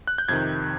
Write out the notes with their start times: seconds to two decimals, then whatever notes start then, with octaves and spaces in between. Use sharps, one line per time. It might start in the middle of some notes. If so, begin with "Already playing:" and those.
0.07 F#6
0.18 G6
0.29 F2 C3 D#3 G#6